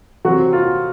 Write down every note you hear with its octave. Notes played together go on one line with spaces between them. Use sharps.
C3 F#3 C4 F#4
F4